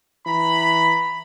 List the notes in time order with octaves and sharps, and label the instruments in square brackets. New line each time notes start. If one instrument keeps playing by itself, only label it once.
[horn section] E3 A#5 B5